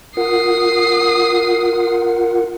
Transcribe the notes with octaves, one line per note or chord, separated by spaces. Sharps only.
F4 A#4 F#5 D#6 C7